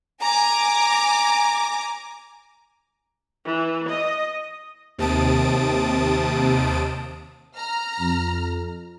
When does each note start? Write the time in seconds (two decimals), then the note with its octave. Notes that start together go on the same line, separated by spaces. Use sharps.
0.23 G#5 A#5 D6
3.45 E3
3.88 D#5
4.98 D#2 C3 A5 D#6 D7
7.56 A#5 F6
7.99 F2